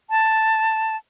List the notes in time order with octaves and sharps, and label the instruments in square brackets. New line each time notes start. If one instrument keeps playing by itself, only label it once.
[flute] A5